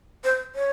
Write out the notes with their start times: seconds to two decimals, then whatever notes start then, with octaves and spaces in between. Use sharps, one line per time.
0.24 C5
0.55 C#5